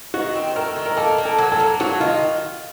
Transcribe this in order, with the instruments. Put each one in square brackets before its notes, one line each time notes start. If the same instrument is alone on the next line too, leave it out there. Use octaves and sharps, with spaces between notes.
[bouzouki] D#3 [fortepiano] F#4
[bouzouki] C4
[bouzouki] A3 [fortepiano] A#4
[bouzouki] D#3
[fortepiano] A#4
[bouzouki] A#3 [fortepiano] A4
[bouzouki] A#3
[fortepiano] A4
[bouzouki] F#3
[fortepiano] A4
[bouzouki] A#3
[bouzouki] F#3 [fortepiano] F#4
[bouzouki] D#3 [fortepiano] F4